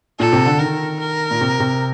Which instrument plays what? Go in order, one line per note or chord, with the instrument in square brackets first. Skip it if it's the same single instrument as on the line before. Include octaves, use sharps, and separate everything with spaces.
[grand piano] A#2 [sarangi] A4
[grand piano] C3
D3
[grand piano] D#3 [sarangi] A#4
[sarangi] A#4
[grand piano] A#2
C3
C3